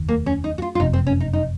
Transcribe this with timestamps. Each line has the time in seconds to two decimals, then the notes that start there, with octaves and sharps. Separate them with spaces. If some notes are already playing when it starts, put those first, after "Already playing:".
Already playing: F1 D#2 D#3
0.09 A#3
0.26 C#4
0.44 D#4
0.58 F#4
0.62 F4
0.75 F4
0.79 F#1 F2 C3 D#4
0.93 C4
1.07 C#4
1.20 D#4
1.33 D#4